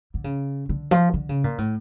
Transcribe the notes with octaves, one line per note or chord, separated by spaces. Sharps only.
D3
C#3
D3
F3
D3
C#3
A#2
A2